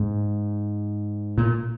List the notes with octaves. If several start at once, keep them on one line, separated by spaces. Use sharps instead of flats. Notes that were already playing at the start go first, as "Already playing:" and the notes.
Already playing: G#2
A#2